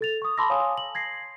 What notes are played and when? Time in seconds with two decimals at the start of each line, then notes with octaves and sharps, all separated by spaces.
0.01 A4 A6 F7
0.22 C#6 D#6
0.38 A5 B5 C6 D6 E6 A#6
0.50 C#5 F5 G#5 C6 D#6
0.78 F#7
0.95 G#6 A#6 C7